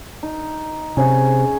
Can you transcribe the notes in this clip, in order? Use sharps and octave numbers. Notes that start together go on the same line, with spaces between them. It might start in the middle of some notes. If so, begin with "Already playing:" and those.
D#4
C3 C#4 G#4